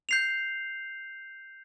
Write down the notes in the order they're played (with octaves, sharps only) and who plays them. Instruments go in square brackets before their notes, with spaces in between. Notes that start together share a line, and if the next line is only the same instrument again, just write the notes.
[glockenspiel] G6 C7 F7